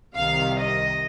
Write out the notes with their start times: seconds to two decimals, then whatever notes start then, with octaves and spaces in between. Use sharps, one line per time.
0.14 C2 C3 D#3 F5
0.56 D#5